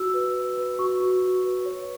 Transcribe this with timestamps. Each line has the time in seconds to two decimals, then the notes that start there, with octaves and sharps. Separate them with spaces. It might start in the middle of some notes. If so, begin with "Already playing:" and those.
Already playing: F#4 E6
0.14 B4
0.36 B4
0.57 B4
0.79 F#4 C#6
1.00 F#4
1.22 F#4
1.44 B4
1.65 C#5